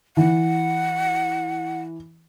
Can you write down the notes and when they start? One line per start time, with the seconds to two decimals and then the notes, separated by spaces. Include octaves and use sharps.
0.17 E3 F#5